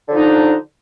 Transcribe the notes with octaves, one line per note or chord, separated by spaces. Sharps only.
D3 F3 D4 D#4